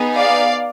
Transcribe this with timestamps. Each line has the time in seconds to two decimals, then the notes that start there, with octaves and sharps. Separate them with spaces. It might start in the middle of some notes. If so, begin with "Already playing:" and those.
Already playing: B3 D#4 G#4
0.15 D5 F5